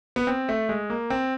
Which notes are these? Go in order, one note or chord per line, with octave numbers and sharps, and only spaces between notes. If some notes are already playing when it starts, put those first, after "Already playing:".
B3
C4
A3
G#3
A#3
C4